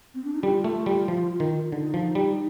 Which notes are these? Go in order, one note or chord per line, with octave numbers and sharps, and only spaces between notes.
C4
D4
D#4
G3 F4
A3
G3
F3
D#3
D3 D#4
F3
G3